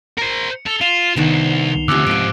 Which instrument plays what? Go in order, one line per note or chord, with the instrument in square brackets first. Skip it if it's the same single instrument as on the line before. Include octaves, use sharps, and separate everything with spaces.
[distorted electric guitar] A#4 C5 [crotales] C#7
[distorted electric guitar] A4 [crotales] F7 G7
[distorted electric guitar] F4 [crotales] C7 E7 F7
[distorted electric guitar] C2 [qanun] D#3 B3 D4
[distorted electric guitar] D2 [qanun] C3 F3 C#4 [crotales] D6 E6 F#6
[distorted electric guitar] G#2 F3 [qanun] D#5 F5 [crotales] D7